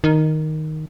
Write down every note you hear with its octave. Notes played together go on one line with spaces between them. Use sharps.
D#3